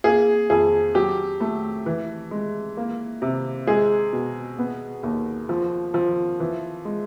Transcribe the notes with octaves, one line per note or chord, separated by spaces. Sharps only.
A#3 G#4
F2 G#4
F#3 G4
A3
E3
G#3
A#3
C3
G#3 G#4
B2
B3
D#2
F3
F3
E3
G#3